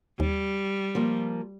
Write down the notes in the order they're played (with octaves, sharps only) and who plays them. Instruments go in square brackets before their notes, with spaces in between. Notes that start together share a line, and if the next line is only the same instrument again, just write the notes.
[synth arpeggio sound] D#2 [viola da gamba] G3
[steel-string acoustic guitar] F3 A#3